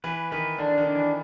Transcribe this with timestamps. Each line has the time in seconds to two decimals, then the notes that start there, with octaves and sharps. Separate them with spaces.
0.04 E3 B4
0.31 D#3 B4
0.59 D3 D4
0.78 D#3
0.87 D4
0.95 E3